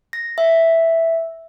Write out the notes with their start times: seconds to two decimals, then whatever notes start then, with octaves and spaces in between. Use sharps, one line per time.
0.13 A#6
0.38 E5